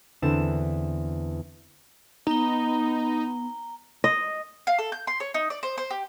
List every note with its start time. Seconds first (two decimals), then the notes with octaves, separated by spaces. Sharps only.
0.22 E2 D3 C4 D4 E4 E7
2.27 B3 D#4 A#5 G7
4.04 D#5
4.67 F5
4.79 A4
4.92 G6
5.07 C6
5.20 C#5
5.34 D#4
5.50 D5
5.63 C5
5.78 C5
5.91 G4